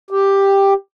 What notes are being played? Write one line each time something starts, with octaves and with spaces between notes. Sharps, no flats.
G4